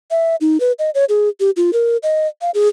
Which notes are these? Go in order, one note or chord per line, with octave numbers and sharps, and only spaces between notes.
E5
D#4
B4
D#5
C#5
G#4
G4
F4
A#4
D#5
F5
G#4